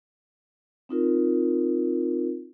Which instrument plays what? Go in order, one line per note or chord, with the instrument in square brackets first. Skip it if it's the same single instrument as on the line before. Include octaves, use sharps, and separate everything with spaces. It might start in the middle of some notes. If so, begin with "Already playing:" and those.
[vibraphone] C4 D#4 F4 A#4